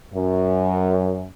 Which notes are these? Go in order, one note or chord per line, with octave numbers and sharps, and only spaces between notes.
F#2